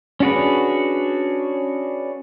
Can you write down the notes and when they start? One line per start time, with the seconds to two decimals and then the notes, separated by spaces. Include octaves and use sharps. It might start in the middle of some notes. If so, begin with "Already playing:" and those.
0.20 C#4 D4 F#4 G#4 B4